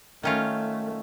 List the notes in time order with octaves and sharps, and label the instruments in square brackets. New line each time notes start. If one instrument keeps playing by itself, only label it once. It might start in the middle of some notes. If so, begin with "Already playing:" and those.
[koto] D#3 C#4 F4 [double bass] A3